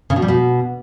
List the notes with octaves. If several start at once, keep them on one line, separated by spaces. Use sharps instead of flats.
C#3
B2
G3
B2